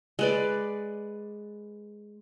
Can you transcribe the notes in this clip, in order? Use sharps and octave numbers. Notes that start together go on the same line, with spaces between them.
G#3 B4 D5